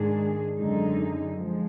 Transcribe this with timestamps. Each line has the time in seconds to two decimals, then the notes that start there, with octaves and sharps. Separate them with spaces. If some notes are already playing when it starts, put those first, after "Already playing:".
Already playing: G#2 D#3 G#3 D4 G#4
0.54 F#2 D3 G#3 D#4
1.38 F3 G#3